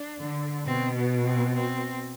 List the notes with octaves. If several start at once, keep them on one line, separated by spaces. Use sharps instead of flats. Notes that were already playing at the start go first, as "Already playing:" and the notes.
Already playing: D4
D3
B2 C4
B3
C4
C4